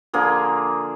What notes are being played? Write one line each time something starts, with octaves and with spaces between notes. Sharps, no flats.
D3 F3 A#3 G#4